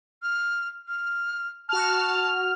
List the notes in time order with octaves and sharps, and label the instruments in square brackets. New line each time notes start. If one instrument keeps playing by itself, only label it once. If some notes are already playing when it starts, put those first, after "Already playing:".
[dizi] F6
F6
[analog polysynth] F#4 F6 [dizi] A5